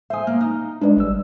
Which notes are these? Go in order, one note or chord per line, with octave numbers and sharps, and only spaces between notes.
C5 E5 G#5 D#6
A#3 F6
D#4 D#6 F6
G#3 D4 B4 D5
G#1 G3 E6